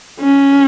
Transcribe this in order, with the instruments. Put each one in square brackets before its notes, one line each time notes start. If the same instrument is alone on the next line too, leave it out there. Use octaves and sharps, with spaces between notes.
[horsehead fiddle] C#4